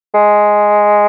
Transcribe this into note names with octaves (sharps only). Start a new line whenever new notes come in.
G#3